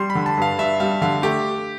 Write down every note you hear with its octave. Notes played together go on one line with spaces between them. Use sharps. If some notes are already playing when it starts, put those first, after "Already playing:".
Already playing: G3 C6
B5
D3
A5
G2 F5
G2 E5
G3 F5
D3 F5
A3 G4